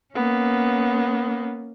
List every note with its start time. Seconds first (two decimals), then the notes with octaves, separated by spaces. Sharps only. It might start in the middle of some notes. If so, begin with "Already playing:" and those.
0.15 A#3 B3 C#4